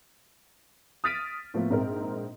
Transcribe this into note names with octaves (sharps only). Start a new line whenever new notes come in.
D#6 F6 A6 B6 D7 D#7
A2 F3 A#3 B3
A#1 G#2 C4 A#4